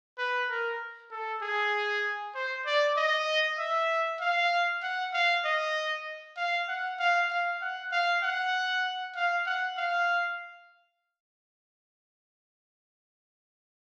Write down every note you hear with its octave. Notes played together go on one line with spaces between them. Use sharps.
B4
A#4
A4
G#4
C5
D5
D#5
E5
F5
F#5
F5
D#5
F5
F#5
F5
F5
F#5
F5
F#5
F5
F#5
F5